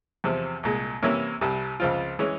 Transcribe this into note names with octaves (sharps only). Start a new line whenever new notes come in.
E2 C3 F3 C4
C2 A#2 G#3
C3 E3 A#3 C#4 E4
C2 C3 G3
C#2 C#3 F3 C4 F4
E3 G#3 C#4